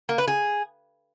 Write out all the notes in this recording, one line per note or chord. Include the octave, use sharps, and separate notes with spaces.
A#3
B4
G#4